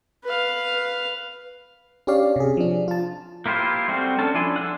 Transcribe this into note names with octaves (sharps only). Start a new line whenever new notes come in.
B4 F5
C#4 D4 G4 C#5 D5 F5
C3 G#4
F3 D4
F4 A5
A#3 E4 F4 G4 C5
G3 A3 C4 F#4
C#4 D4 A4 A5
F3 D4 E4 G#5 C6
D4 A4 F#5